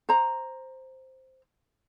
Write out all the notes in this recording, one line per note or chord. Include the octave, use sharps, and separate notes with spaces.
C5 A#5